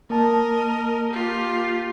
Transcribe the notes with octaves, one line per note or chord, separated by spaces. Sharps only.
A#3 A#4 D#5 A5
F4 G4